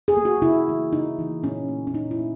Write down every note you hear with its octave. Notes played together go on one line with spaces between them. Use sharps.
G#4
A#3
F#4
C#3 E4
E3 A#3
C#3 D#4
E3 A#3
A#2 C#4
A#3
C#4
A#2 D#4
E4
A#3